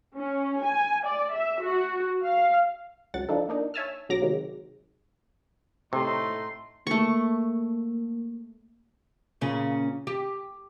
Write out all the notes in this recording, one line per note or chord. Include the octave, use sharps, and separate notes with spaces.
C#4
G#5
D5
E5
F#4
F5
C#2 F#3 F#5 A6
F3 D4 D#4 A4
A#3 D4 D#4
C#5 E5 G#5 A5 E6 F6
B1 F#3 A#5 D6 A#6
C3 D#3 F#3 G#3
A2 C3 A3 D#4 C6
A3 A#3 C#6
A#2 C#3 C#4
G4